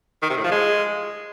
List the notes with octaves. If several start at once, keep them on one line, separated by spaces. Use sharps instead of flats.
D#3
C3
A2
F3
G#3